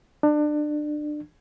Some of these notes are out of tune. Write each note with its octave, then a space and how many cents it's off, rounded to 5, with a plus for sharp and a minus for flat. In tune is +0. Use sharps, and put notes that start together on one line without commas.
D4 +25